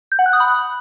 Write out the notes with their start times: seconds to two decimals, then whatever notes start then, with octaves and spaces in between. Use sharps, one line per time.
0.12 G6
0.19 F#5
0.26 F#6
0.33 D#6
0.40 B5